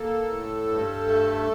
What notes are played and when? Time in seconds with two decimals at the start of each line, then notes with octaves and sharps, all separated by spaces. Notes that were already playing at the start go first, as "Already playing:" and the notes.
Already playing: A#3 A4
0.28 A2
0.68 G2
1.07 A3